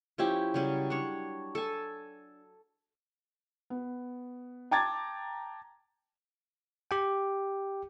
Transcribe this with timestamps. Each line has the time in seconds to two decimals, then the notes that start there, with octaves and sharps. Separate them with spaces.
0.18 F3 C#4 E4 G4
0.54 C#3 F#3 G3 C#4
0.90 D4 C#5
1.55 A4 G#5
3.70 B3
4.71 G5 A5 A#5 D6 G#6 A6
6.91 G4 G5